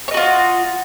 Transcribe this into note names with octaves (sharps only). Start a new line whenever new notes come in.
F4 F#4 C#5 D#5